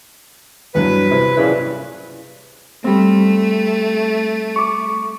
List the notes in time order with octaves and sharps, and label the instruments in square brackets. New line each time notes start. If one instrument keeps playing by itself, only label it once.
[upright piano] E2 G2 F#3 [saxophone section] B4
[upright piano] C3 C4 E4
[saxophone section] G2 A#2 C#3 [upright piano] E4
[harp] G3 C4 [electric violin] A3
[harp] C#6 D6